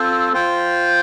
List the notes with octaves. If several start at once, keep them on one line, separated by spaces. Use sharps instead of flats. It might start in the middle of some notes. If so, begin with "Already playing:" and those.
Already playing: C4 F4 A4 C5
F4 C5 G5